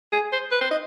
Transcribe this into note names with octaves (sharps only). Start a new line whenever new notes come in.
G#4
C5
B4
C5
D#5